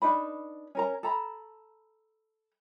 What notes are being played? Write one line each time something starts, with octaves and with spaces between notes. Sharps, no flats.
D4 D#4 B4 B5
C#4 A#4 A#5
A4 A#5 B5